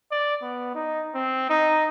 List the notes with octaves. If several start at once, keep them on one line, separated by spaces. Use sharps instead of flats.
D5
B3
D#4
C4
D#4